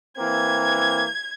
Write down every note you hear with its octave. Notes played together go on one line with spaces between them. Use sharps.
E3 A#3 C4 G#6